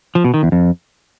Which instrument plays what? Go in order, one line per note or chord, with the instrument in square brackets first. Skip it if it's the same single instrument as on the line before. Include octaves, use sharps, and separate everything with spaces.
[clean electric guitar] F3
B2
D#3
E2
F2